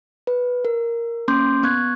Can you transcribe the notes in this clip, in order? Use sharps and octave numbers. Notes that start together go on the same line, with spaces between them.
B4
A#4
A#3 C#4 C6 D6 G6
B3 C#6 F#6 G#6